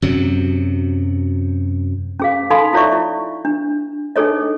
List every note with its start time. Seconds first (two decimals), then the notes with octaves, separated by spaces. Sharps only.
0.02 F#2 C3 F#3
2.20 C#4 G#4 F5
2.50 D#4 A4 F5 G#5 B5 C6
2.73 E4 F4 C#5 D5 E5 C#6
2.93 E4
3.45 D4
4.16 D4 D#4 G#4 A4 C#5 D#5